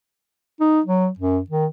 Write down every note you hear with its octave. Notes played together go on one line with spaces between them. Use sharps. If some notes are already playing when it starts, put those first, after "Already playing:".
D#4
F#3
F#2
D#3